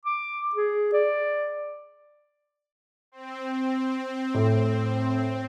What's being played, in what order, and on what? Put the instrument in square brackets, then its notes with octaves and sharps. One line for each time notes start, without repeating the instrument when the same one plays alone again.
[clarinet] D6
G#4
D5
[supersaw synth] C4
[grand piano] A2